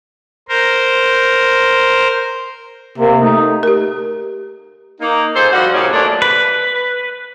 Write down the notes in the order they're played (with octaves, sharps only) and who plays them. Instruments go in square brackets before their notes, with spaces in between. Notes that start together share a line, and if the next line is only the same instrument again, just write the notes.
[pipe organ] A#4 C5
[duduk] C3 [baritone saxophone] A#3
[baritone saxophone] A3 [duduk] D#4
[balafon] G4 A#4
[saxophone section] A#3 D#4
F4 G#4 A4 C5
F3 G3 F#4
A#2 C#3 F3 G3 C#4 D#4
F#3 A3 A#3 D4
[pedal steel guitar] B4